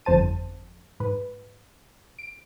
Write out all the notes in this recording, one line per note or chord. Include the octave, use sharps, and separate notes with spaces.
G1 F2 C5 A5 D#7
G#2 B4
D7